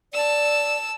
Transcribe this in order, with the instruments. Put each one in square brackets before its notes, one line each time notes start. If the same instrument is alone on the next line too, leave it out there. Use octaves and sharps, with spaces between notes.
[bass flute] D5 [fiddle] A5 E6